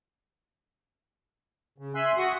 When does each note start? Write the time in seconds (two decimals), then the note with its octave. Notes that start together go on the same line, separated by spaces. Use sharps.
1.78 C#3
1.95 E5 G#5 C6 E6 F#6
2.17 F#4 F#5 C#6 D#6